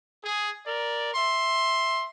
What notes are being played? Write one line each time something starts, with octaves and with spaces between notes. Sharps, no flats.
G#4
A#4 D5
E5 C6